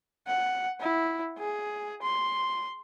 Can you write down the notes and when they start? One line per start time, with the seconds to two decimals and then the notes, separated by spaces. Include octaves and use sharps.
0.27 F#5
0.80 E4
1.39 G#4
2.02 C6